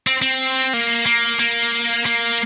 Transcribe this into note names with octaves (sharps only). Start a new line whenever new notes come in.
C4
C4
A#3
A#3
A#3
A#3